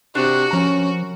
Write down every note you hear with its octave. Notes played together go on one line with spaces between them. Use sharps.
C3 D4 F#4 C5
F3 C#4 A#4 A#5